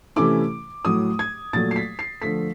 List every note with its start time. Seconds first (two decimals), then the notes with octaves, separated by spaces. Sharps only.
0.16 C3 E3 A3 C#4 E4 D6
0.85 A2 F#3 A3 D#6
1.19 G#6
1.53 A#2 F#3 A3 A6
1.71 C7
1.76 B6
1.99 C7
2.22 D3 F3 A3 B6